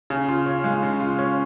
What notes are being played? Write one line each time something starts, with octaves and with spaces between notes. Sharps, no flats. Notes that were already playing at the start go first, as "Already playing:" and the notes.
C#3
F4
C#4
G#3
C#3
F4
C#4